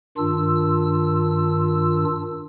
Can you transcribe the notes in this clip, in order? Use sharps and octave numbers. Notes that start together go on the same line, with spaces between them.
G2 D#3 D4 F4 E6